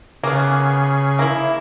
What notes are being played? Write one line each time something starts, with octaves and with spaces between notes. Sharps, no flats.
C#3 A#3 B3 G#4
A#3 E4